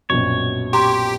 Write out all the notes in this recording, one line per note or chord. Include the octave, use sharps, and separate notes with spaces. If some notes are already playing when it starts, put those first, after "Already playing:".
A#1 F#2 B2 C#5
G4 A#5 C6